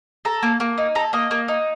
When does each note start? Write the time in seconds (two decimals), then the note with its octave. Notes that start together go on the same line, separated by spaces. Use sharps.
0.25 A4 A#5
0.43 A#3
0.60 A#3
0.78 D#4
0.95 A4 A#5
1.13 A#3 D#5
1.31 A#3
1.48 D#4